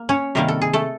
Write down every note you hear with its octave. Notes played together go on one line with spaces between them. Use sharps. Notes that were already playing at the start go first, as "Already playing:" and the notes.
Already playing: A#3
C#4 C#5
C3 D#3 G3 A#3 A#4
A4
G#4
A3 A4